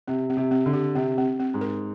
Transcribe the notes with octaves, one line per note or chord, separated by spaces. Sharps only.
C3 C4
C4
C3
C4
D3
G4
C3 C4
C4
C4
G#2
A#4